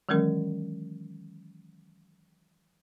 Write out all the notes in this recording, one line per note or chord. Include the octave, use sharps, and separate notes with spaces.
D#3 E3 F#3 G#3 C#4 A#4